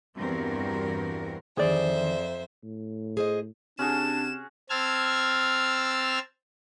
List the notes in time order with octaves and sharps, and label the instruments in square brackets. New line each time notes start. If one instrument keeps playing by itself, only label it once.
[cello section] E2 G2 C4 F#4 A#4
[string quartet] F2 C5 E5 [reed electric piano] D#3 E3 [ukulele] G#4 D5
[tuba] A2
[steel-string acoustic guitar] G#4 C5 D#5
[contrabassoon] C3 [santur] C#4 F#4 G#4 [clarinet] D4 [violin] E7
[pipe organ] C4 A5 E6 F6 G#6